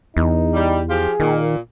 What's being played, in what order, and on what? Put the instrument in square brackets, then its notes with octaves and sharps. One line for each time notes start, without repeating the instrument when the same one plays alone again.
[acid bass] E2 [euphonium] D#4
[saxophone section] G3
[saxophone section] F3 F4 G4 [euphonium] G#4
[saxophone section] A#2 [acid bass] D#3